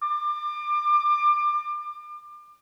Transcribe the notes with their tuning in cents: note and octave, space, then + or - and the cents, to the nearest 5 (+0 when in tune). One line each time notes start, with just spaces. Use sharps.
D6 +30